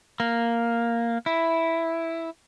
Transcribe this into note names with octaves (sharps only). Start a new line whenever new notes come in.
A#3
E4